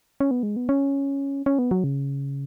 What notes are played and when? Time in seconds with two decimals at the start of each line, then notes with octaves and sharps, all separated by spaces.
0.20 C#4
0.31 B3
0.43 G#3
0.56 B3
0.69 C#4
1.46 C#4
1.59 B3
1.71 F#3
1.84 C#3